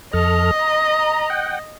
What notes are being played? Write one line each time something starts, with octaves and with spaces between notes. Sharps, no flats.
F2 A4 D#5 F6
A#5
F#5 G5